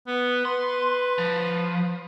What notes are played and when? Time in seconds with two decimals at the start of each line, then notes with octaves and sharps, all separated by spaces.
0.07 B3
0.45 B4 C6
1.18 F3